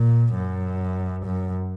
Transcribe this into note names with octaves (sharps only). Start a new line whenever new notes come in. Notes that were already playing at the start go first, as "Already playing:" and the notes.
Already playing: A#2
F#2
F#2